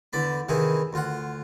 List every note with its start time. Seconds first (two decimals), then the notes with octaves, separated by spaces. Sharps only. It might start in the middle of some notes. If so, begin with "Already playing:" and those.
0.13 E2 D3 D5 B5
0.49 C3 D#3 E3 E4 G#4
0.93 D2 F4 F#5